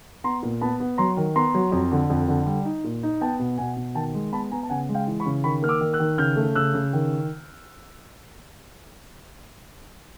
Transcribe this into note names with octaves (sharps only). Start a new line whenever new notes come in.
B3 A#5 C6
A#2
B3 A5 B5
B3
F#3 A#5 C6
D#3
B3 A#5 C6
F#3
F2
D3
F2
D3
G3
D#4
A#2
D#4
B3 G5 A5
B2
B2 F#5 G#5
B2
D#3 G5 A5
G#3
B3 A5 B5
B3 G#5 A#5
A5
C#3 F#5 G#5
G#3
F5 G5
E3
B5 C#6
C#3
D#3 B5 C#6
A#3 F6
D6 E6
D#3
E6 F#6
D#3
C#3 F6 G6
A3
C#3 E6 F#6
C#3
D#3